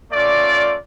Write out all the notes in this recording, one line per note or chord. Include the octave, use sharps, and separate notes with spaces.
A3 C#4 F4 D5